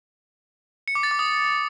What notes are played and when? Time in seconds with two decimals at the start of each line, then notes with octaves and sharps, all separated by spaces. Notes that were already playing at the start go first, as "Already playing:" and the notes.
0.88 C#7
0.95 D6
1.03 A6
1.11 D6
1.19 D#6